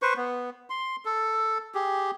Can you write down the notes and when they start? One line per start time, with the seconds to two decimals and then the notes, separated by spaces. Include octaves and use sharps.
0.02 B4 C5 C#6
0.17 B3
0.70 C6
1.05 A4
1.75 G4 G#4